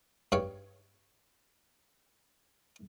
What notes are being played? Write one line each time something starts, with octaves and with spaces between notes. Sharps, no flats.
G2 C#5 F5 G5 C#6